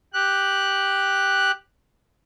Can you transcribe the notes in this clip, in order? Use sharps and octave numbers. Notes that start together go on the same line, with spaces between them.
G4 F#6